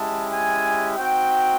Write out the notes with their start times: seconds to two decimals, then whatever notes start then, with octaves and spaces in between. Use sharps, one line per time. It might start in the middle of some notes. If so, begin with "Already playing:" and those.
Already playing: G#3 C#4 E4 G4 A5
0.32 G#5
0.98 C4 D#4 F#4 G5